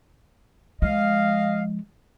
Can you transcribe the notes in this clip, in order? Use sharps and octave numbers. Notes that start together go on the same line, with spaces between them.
F3 G#3 D#5 F5